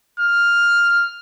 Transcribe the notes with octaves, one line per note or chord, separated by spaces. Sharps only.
F6